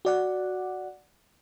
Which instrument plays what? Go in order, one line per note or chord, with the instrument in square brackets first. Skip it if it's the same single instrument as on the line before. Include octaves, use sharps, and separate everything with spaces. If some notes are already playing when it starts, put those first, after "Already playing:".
[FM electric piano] F#4 D5 F#5